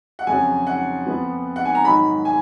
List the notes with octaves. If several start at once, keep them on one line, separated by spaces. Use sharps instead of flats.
F#5
F2 C#3 F#3 G#5
F#5
F2 F3 B3
F#5
G#5
A#5
G#2 D#3 F#3 B5
G#5